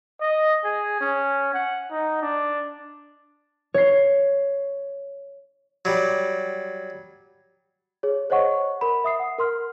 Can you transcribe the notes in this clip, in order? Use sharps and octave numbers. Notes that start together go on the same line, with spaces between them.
D#5
G#4
C#4
F#5
D#4
D4
C#5 C7
F#3 G3
G#4 C#5
C5 C#5 D#5 F#5 C#6
A#4 B5
E5 D#6 C7
F#5
A#4 C6 F6